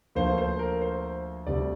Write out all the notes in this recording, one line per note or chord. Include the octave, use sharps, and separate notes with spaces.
D2 D3 F3 A#3 C5
C5
A#4
C5
D2 C3 G3 D5